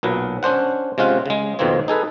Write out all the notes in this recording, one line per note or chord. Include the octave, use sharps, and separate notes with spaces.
B1 A#2 F#3 B4
C#4 D4 C5 F#5
C3 G#3 C#4 F4 F#5
C#3 G#3
F2 B2 D#3 A#3 C4 C#5
D#4 G#4 A4 B4